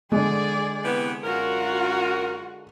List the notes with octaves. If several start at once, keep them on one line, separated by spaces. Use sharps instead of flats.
D3 G#3 G#4 D5
C3 E3 B3
F#2 F4 F#4 A#4